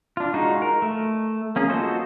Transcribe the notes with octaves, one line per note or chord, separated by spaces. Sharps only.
D4 F4
G#3 D#4 F4 F#4
A#4
A3
A#3 C#4 G#4
F4 F#4 A4 C5 D#5